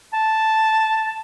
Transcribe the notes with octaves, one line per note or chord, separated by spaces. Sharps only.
A5